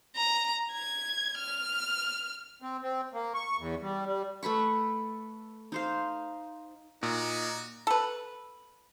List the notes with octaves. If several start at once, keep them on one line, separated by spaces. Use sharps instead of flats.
A#5
G#6
F6
C4
C4
A#3
C#6
E2
G3
G3
A3 B4 B5 C#6
D#4 C5 F5
A#2 D#4 F#4
A4 B4